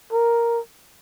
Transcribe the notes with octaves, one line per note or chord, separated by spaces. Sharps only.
A#4